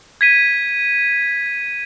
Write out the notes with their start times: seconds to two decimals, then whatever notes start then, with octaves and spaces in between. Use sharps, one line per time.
0.21 G#6 B6 D#7